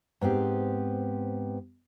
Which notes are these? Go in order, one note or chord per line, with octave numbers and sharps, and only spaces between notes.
G#2 B3 C4 G4